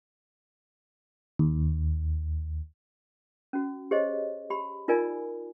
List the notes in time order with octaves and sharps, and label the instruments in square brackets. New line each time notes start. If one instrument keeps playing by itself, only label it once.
[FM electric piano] D#2
[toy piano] C#4 F#4
G4 G#4 C5 C#5 D#5
G4 B5
D#4 F4 A#4 D5 G#5